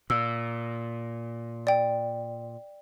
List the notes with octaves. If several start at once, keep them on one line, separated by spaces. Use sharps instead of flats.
A#2 E6
D5 G5